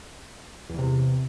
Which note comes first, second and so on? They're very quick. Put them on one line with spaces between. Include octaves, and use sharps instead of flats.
E2 E3 C3